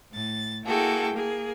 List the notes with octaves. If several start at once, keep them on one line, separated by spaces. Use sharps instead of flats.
A2 A6
A#3 E4 F#4 G#4 A4 G5
A#3 G#4